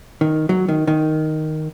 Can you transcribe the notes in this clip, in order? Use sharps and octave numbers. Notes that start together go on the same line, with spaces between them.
D#3
F#3
D#3
D#3